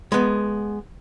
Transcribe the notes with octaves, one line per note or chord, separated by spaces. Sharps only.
G#3 B3